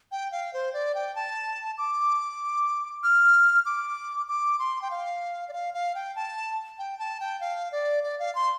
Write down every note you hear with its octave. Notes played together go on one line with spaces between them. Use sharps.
G5
F5
C5
D5
G5
A5
D6
F6
D6
D6
C6
G5
F5
D5
F5
F5
G5
A5
G5
A5
G5
F5
D5
D5
F5
C6